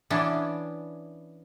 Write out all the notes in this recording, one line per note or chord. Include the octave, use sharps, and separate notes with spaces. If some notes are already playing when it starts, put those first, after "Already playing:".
E3 B3 C#4 D4